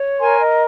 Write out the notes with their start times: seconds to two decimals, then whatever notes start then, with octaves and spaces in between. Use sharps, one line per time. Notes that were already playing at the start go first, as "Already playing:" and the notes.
Already playing: C#5
0.19 A#4 G#5 C6
0.40 D#5